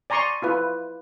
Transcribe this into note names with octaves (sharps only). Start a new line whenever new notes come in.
D5 G#5 A#5 C6 C#6
E4 F4 B4